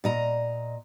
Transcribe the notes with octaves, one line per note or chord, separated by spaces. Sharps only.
A#2 D#5 A#5